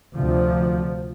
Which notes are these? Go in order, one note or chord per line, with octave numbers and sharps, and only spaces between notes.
D2 C3 F3